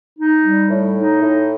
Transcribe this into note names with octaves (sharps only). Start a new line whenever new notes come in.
D#4
G3
A2
D#4
A2